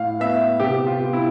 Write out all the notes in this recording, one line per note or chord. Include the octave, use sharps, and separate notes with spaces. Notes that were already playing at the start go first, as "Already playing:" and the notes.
Already playing: A2 F5
B3 E5
C3 G4
F4
B3
E4